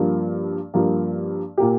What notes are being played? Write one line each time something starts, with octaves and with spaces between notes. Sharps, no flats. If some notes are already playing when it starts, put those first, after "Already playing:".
Already playing: G2 F3 A#3
G2 F3 A#3
A#2 A#3 G4